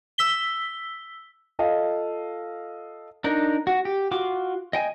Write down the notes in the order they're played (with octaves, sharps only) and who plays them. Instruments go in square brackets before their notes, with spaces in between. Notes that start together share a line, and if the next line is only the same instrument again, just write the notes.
[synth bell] E6 B6 G7
[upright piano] F4 A4 D#5 F5
[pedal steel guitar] D4 D#4 A#4
F#4
G4
F4 F#4 D6
D#5 G5 G#5